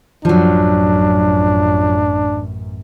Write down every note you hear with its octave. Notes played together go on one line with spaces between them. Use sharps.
A1 F#2 F3 F#3 D4